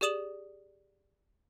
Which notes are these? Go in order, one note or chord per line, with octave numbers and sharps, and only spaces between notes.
G4 G#4 D5 D#6 E7 F#7